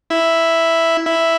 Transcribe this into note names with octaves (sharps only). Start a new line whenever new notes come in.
E4
E4